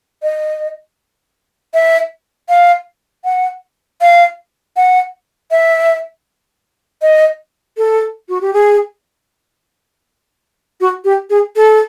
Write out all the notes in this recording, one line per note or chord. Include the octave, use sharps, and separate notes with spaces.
D#5
E5
F5
F#5
F5
F#5
E5
D#5
A4
F#4
G4
G#4
F#4
G4
G#4
A4